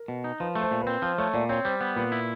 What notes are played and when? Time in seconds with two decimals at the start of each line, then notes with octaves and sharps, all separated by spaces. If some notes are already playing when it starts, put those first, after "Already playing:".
Already playing: A#4
0.08 B2
0.24 D#4
0.40 F3 B4
0.55 A3
0.61 C5
0.71 A#2
0.82 B4
0.87 C4
1.02 F3 C5
1.18 A3 C#5
1.34 A#2 D5
1.49 C4 C#5
1.65 G3 C5
1.81 B3
1.96 A#2 B4
2.12 E4